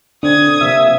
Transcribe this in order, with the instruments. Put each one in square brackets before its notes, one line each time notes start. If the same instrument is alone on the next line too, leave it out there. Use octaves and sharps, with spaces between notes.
[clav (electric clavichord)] D3 C4 [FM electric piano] D4 [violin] D#6 G#6
[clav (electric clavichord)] C3 F3 A#3 [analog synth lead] E5